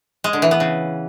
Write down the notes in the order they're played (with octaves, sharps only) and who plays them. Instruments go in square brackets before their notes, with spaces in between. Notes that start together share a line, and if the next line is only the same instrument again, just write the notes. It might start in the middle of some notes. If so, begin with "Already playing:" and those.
[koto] G#3
D3
E3
B3
C#3